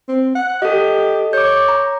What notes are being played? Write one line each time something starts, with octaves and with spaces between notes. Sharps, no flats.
C4
F#5
G4 A4 D#5
C#5 D6 G6
A#5